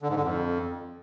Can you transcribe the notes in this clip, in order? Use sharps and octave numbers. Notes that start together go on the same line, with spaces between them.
D3
G#2
D3
F2